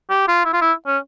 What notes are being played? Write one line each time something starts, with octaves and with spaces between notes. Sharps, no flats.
G4
F4
E4
F4
E4
C#4